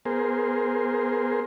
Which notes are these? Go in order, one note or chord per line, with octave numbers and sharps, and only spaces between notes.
B3 G#4 A#4 C5